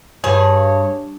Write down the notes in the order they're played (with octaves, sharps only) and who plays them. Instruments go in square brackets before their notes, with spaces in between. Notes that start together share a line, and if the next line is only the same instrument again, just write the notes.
[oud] G2 [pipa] G#4 [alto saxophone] C#5